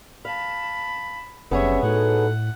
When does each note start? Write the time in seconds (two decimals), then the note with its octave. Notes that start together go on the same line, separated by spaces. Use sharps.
0.25 F5 A5 B5
1.51 F#1 C3 G3 B3 C#4 G#4 C#5 E5
1.83 A2 D#4 F#4 A4 F#5